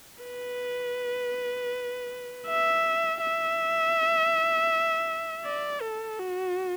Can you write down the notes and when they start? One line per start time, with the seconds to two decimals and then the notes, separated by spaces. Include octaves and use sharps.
0.24 B4
2.47 E5
3.21 E5
5.45 D5
5.82 A4
6.20 F#4